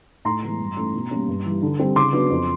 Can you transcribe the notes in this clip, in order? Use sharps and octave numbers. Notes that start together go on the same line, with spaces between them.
A2 A#5 C6
E3 G#3 B3
G2
E3 A3 C#4
B2
G3 A#3 C#4
G2
E3 G3
D3
G3 C4
C#3 C6 D6
F#3 B3 D4
F2